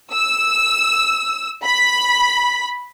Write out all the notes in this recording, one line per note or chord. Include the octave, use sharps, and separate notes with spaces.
E6
B5